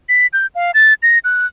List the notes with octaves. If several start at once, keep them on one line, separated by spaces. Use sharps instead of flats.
B6
G6
F5
A6
A#6
F#6